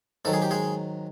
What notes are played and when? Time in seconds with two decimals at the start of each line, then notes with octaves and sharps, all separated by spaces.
0.25 G#2 D#3 F#3 A4
0.33 G#4
0.42 G4
0.51 G#3 G#4